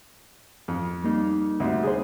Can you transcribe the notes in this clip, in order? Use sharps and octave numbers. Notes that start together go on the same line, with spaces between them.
F2
G3 A#3 D#4
D2 C3
G#4 C5